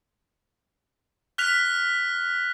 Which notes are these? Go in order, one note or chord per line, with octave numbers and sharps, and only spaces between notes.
F6 F#6 B6 F7